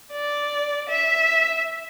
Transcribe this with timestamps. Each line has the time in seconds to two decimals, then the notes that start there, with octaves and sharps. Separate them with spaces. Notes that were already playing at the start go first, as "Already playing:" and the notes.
0.13 D5
0.89 E5